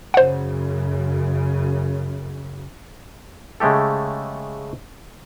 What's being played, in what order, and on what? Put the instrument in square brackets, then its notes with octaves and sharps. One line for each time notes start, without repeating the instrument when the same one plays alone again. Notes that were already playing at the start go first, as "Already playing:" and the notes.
[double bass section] F#2 C#3 [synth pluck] C5 F#5
[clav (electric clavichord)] C#3 G#3 A3 G4 A4